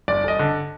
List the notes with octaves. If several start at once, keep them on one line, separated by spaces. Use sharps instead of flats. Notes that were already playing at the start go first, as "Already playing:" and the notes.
G1 D5
G1 D#5
D3